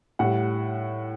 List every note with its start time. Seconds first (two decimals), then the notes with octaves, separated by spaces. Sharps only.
0.19 A2 G3 F#5